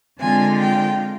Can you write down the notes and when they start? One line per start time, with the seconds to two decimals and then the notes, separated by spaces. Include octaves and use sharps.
0.19 D3 G#3 C4 F4 G#5
0.59 G5